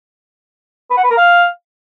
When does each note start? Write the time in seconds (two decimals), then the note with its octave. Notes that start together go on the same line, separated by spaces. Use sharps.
0.90 B4
0.97 F#5
1.04 B4
1.11 A#4
1.17 F5